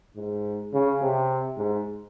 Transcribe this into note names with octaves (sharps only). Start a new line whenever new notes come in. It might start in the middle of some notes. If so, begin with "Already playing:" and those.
G#2
C#3
C3
G#2